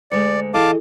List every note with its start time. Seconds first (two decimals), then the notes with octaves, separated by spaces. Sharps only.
0.12 D2 G#3 D5 C#7
0.54 E3 E4 G#4 A4 D#5 F5 A5 D6